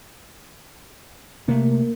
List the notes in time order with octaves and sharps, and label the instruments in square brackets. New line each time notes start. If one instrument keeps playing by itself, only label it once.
[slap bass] C3 A3 [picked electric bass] A#3